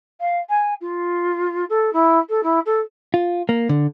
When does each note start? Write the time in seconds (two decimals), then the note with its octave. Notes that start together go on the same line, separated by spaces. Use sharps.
0.20 F5
0.49 G#5
0.80 F4
1.69 A4
1.93 E4
2.29 A4
2.43 E4
2.65 A4
3.14 F4
3.49 A#3
3.69 D3